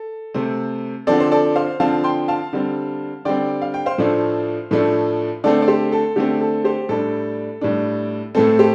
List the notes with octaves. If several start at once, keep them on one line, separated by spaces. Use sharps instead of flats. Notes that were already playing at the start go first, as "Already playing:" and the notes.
Already playing: A4
C3 A3 C4
D3 F3 C4 A4 D5
C5
A4 D5
C5 F5
D3 F3 C4 F5 A5
G5 C6
F5 A5
D3 G3 C4
D3 G3 C4 D5 G5
F5
G5
C5 F5
A2 F3 A3 D4
A2 F3 A3 D4
D3 A3 C4 A4 D5
D5
G4 C5
A4
D3 A3 C4 G4
A4
G4 C5
A2 G3 D4 A4
A2 G3 D4
A2 A3 C4 A4
G4 C5